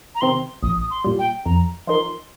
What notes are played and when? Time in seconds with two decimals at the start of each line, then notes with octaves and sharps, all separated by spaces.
0.15 A#5
0.21 C3 D#3 C4 C6
0.63 A#1 D#6
0.81 D#6
0.90 C6
1.04 A#2 G3
1.19 G5
1.45 F2 A#5
1.87 F3 D#4 A#4 C6